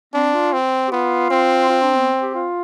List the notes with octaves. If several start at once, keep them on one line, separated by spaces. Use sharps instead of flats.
C4 D4
F4
C4
G4
B3 F4
C4
F4
D4
B3
G4
F4